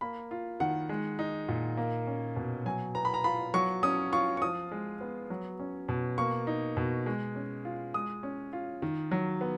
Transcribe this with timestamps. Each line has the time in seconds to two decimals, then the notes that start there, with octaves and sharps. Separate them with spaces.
0.01 A#3 B5
0.31 F4
0.60 D#3 F#5
0.89 G#3
1.19 D#4
1.49 A#2
1.77 A#3
2.07 C#4
2.36 B2
2.65 F#3 G#5
2.95 B3 A#5
3.05 B5
3.14 A#5
3.24 F4 B5
3.54 F#3 C#6
3.83 C#4 D#6
4.12 F4 C#6
4.37 C#6
4.42 F3 D#6
4.72 G#3
5.01 B3
5.30 F#3
5.59 C#4
5.89 B2
6.18 A#3 C#6
6.47 D#4
6.77 B2
7.06 G#3
7.35 C#4
7.65 F4
7.94 G#3 D#6
8.23 C#4
8.53 F4
8.82 D#3
9.11 F#3
9.41 B3